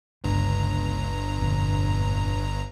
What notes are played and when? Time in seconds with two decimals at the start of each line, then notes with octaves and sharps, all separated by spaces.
0.24 G1 C#2 G2 A#5
1.39 A#1 F2 D3